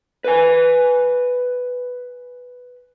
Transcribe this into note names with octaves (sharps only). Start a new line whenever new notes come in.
B4 G#5